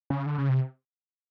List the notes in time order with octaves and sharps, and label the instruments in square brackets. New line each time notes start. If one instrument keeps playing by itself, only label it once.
[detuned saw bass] C#3
D3
C#3
C3